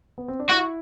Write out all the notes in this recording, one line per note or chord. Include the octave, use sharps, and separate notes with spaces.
B3
C4
D4
E4 F#4